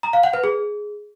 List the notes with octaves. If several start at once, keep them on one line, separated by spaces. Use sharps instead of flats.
A#5
F5
F#5
B4
G#4